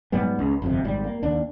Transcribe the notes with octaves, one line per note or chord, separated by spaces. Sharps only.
G#2 F#3 G3 B3
C#2
G1 F2 C3
G#1 G#2 G3
A#3
D#2 D4